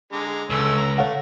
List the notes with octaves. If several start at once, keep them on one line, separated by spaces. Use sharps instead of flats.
D3 G#3 A#5
C#2 A3 C#4 E6
A#5
A3 C#5 F5 F#5